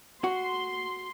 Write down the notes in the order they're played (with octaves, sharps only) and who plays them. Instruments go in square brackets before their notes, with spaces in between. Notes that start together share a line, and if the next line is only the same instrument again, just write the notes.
[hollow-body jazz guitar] F#4 [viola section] C6